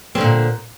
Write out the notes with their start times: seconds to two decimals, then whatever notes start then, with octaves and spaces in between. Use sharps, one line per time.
0.15 C4
0.18 D3
0.21 A#2